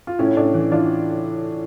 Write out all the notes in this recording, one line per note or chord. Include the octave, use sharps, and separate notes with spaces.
F4
A2 C#4 E4
A2 D4
E3
E3 D4 F4